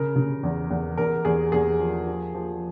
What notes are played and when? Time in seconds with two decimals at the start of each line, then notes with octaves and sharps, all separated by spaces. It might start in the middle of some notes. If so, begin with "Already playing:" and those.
Already playing: C#3 A#4
0.16 C#3
0.43 E2
0.70 E2
0.98 E2 A#4
1.25 E2 G#4
1.52 E2 G#4
1.81 F3
2.07 F3
2.34 F3